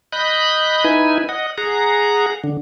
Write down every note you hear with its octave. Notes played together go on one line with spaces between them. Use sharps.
D#5 B5 F#6 G6
D#4 E4 B4 G#5
D#5 F#5
G#4 F#5 A#5
D3